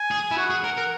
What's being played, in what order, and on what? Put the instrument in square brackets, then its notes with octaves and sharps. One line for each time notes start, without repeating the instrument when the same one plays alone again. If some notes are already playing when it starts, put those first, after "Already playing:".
Already playing: [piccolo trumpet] G#5
[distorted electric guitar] G#4
E4
[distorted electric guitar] F#4 [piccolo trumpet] F#5
[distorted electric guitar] G#4
A#4
A#4